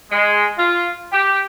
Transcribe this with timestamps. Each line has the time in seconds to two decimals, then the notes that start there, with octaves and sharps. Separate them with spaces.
0.11 G#3
0.57 F4
1.12 G4